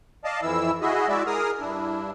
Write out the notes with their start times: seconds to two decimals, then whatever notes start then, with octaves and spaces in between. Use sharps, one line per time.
0.24 D5 D#5 F5 A5
0.43 F2 E3 E4 E6
0.81 E4 F#4 G#4 D#5 E5
1.08 G#3 E4 F#4 D5 E5
1.27 G#4 A#4 D#6 F6
1.60 G2 D4 E4